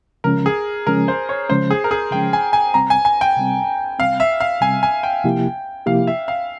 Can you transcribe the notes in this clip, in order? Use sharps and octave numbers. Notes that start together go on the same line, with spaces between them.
C#3 F3 G#3 C#4 A#4
G#4
C#3 F3 G#3 C#4 A#4
C5
C#5
C#3 F3 G#3 C#4 C5
G#4
A#4
G#4
C#3 F3 G#3 C#4 G5
G#5
G#5
C3 G3 C4 A#5
G#5
G#5
G5
C3 G3 C4
C3 G3 C4 F5
E5
F5
C3 G3 C4 G#5
G#5
G5
C3 F3 A#3 E4 G4
C3 F3 A#3 E4 G4 F5
E5
F5